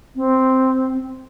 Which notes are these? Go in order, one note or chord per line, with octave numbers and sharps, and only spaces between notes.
C4